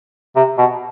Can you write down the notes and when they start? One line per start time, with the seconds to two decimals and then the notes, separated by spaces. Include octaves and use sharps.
0.36 C3
0.58 B2